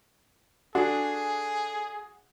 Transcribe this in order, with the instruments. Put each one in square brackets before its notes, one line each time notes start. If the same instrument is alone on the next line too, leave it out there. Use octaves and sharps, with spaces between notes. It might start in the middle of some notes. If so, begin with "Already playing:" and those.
[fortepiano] D4 [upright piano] F#4 [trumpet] G#4 [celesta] A4 G#5 C7